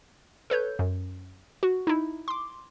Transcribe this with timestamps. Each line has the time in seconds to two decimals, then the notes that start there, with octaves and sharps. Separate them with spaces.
0.50 A4 B4 C#5 G6
0.79 F#2
1.63 F#4
1.87 D#4 E4
2.28 C6 D6